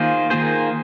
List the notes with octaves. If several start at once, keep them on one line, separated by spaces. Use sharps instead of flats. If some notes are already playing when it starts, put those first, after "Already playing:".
Already playing: D#3 A#3 F4 G#4 C5
D#3 A#3 F4 G#4 C5